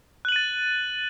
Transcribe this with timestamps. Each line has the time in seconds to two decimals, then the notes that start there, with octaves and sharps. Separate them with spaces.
0.25 F#6
0.29 F#7
0.32 D#7
0.36 A6